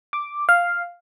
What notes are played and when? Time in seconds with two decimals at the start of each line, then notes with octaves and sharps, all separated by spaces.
0.13 D6
0.49 F5